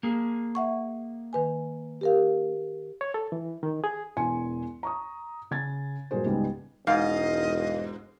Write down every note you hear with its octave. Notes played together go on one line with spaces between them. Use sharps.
A#3 G#4
E5 F#5 C#6
D#3 B4 G#5
G4 A#4 F5
C#5
A4
E3
D#3
G#4
E1 E2 G#5 C6 C#7
A#5 C#6 D#6
C#3 G#6 A6
G2 A#2 F#3 G#4 C5
C#2 G#2 G3 G#3 B3
E1 G#2 D#5 F5